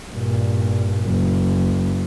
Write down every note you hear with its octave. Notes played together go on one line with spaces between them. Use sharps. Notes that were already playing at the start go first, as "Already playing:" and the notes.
G2 A#2
F#1